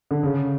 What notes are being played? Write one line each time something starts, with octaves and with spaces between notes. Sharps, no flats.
D3
C#3